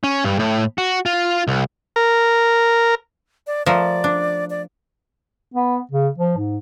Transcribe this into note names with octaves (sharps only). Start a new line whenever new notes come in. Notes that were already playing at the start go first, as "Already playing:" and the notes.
C#4
G2
A2
F#4
F4
C2
A#4
D5
F3 A3 A#4 D5
D4
D5
B3
C#3
F3
G#2